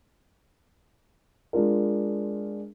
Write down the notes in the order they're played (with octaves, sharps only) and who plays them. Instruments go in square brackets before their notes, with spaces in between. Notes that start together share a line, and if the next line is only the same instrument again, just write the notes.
[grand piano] G#3 D4 F4 A#4